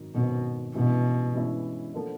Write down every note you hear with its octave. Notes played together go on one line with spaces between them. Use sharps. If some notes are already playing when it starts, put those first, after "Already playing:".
Already playing: G#1 F#2 D#3
G#1 F#2 B2 D#3
G2 B2 E3 G#3 C#4 E4
G2 E3 G#3 C#4 E4
D3 F3 A#3